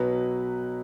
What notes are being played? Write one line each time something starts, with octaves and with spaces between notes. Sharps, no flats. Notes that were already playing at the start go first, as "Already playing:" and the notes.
Already playing: B1 B2 F#3 B4